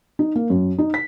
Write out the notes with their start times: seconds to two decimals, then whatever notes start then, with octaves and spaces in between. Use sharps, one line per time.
0.19 D#4
0.36 A#3
0.50 F#2
0.78 D#4
0.94 B6